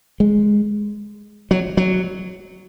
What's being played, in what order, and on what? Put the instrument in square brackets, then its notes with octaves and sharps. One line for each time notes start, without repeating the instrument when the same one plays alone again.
[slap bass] G#3
F#3
F#3